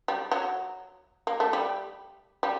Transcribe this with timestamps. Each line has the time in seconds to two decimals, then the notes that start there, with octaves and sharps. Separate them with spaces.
0.08 G3
0.32 F#3
1.27 A#3
1.40 A3
1.53 G3
2.43 G3